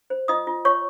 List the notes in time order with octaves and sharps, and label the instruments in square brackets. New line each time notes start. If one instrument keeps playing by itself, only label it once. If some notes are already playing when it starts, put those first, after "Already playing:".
[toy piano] C5
F4 D#5 D#6
F4
F4 C#5 C#6